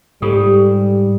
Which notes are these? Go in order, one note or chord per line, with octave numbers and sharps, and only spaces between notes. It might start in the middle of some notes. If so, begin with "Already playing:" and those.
G#2 G3 F4 G4 A4